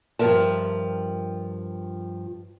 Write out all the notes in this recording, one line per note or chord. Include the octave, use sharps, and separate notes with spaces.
G2 F3 G4 A#4 E5 A5